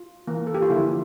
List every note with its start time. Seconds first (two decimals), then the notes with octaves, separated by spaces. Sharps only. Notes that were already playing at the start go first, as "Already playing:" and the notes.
Already playing: F4
0.28 E3 A#3
0.47 A4
0.54 G4
0.62 F4
0.70 D3 F3 A#3 E4